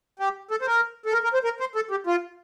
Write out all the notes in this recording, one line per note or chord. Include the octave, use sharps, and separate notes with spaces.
G4
A4
C5
A#4
A4
A#4
A#4
C5
A#4
C5
A4
G4
F4